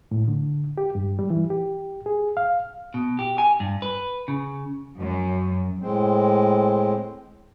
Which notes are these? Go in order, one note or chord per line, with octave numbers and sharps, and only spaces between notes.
A2
D3
G4
G2
G3
E3
G4
G#4
F5
B2
G4
G#5
G2
B4
C#3
F#2
A2 G#3 C4